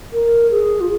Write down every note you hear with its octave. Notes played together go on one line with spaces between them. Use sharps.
A#4
G#4
F4